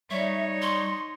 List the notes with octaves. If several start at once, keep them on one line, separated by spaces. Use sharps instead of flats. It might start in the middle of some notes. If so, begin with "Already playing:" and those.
G3 D#4 C#5 E5
C6